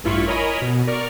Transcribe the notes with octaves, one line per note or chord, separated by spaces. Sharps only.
A1 G2 E4 F4 B5 C#6
A#4 C#5 D#5 G#5 B5 D#6
B2
A#4 D5 C#6 F6